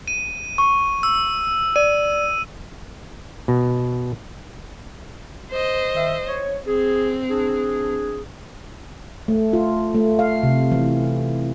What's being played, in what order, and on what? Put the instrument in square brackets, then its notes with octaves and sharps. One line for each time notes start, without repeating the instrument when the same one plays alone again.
[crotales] D#7
[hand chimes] C#6
[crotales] E6
[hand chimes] D5 [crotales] D#7
[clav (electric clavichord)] B2
[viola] C5 D#5
[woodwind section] D#3 E5
C#5
[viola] C4 [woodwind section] G#4
[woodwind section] D4 G#4
[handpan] A3
F4
A3
F5
C3
E3